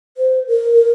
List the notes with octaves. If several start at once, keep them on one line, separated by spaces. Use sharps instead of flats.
C5
A#4